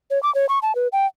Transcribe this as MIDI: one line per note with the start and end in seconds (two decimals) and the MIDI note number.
0.11 0.21 73
0.23 0.33 86
0.35 0.46 73
0.49 0.59 85
0.62 0.75 81
0.75 0.88 71
0.92 1.06 79